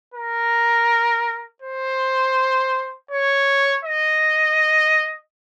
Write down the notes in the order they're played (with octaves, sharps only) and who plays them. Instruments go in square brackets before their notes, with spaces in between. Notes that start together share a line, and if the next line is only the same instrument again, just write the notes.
[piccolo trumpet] A#4
C5
C#5
D#5